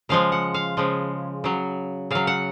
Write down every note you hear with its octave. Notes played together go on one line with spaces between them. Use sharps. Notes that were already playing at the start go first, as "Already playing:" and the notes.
C#3 F3 G#3 F5
F#5
F5
C#3 F3 G#3
C#3 F#3
C#3 F#3 F5
F#5